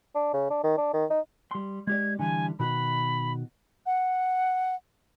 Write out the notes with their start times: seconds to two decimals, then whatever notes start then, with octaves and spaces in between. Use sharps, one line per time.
0.15 D4
0.34 C#3
0.50 D4
0.63 D#3
0.77 D4
0.93 D#3
1.10 D#4
1.51 G3 C6
1.87 G#3 G4 D5 G#6
2.19 D3 E3 G3 G#5
2.59 B2 D#3 F#4 B5
3.86 F#5